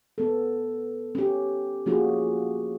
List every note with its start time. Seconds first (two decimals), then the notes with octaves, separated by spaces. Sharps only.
0.18 B3 A4
1.15 C#4 G4
1.86 F3 A#3 C#4 F4 F#4 G#4